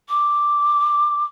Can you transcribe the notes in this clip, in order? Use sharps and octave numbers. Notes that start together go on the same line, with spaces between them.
D6